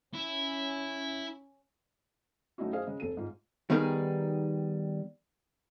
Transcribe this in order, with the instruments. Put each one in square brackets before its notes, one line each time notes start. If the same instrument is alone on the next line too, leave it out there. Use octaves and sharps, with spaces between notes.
[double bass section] C#4 [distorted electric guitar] E4
[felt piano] F#3 A3 C#4 D#4 E4 F#4
G#4 C5 D#5 F5
C#3 G#3
F1 A4 D#7
G#2 F4
[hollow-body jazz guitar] D#3 G3 B3 D#4 G#4 A#4